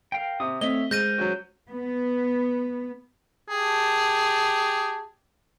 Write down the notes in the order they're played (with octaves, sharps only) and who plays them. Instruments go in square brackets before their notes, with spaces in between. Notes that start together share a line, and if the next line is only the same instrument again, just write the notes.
[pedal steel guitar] A#4 F5 G5
[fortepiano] C3 [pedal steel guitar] D#6
[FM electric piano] A3 C4 [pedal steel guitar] C#5 E5 [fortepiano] D#5 [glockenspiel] G7
[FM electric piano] G#3 [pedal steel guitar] A#4 C5 [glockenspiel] G6 A#6 D#7
[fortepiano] F#3 C#4 F#4
[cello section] B3
[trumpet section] G4 A5 [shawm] G#4